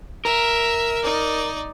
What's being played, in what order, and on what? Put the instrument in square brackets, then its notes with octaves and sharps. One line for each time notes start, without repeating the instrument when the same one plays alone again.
[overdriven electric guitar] A#4 [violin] E5
[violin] D#4 D5